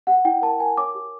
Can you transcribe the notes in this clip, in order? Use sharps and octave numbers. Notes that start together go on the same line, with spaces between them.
G4 F#5
E4 G5
A#4 A5
A#4 G#5
C#5 D6
G4